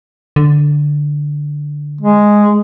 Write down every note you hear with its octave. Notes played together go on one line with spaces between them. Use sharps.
D3
G#3